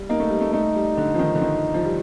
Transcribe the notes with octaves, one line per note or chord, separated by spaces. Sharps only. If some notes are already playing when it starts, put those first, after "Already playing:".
Already playing: G3
A#3 D#4
A3
G3
A3
A3 D#4
G3
D3
F3
D#3
D3
D#3
F3
G3